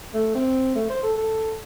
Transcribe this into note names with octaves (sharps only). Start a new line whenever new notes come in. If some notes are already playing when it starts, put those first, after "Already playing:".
A3
C4
A3
C5
A4
A4